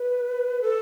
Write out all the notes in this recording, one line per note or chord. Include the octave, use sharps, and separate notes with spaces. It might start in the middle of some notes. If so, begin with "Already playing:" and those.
Already playing: B4
A4